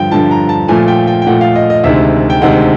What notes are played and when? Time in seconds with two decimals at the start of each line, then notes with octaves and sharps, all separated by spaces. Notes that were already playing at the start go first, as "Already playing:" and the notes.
Already playing: G2 D3 F3 G5
0.11 G2 D3 F3 A5
0.31 A#5
0.49 A5
0.68 A#2 F3 A3 G#5
0.88 G5
1.07 G5
1.22 G5
1.27 A#2 F3 A3 F#5
1.41 F5
1.55 D#5
1.70 D#5
1.84 D2 C3 D#3 G#3 E5
2.30 G5
2.42 D2 C3 D#3 G#3 F#5